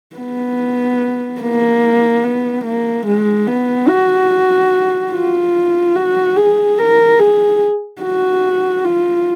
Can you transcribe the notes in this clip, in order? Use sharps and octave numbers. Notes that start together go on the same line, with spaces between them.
B3
A#3
B3
A#3
G#3
B3
F#4
F4
F#4
G#4
A#4
G#4
F#4
F4